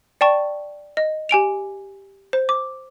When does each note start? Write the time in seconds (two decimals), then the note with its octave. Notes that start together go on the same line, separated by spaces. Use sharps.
0.21 D5 G5 A5 C#6
0.97 D#5
1.29 G4 G#5 D7 F7
2.33 C5
2.49 D6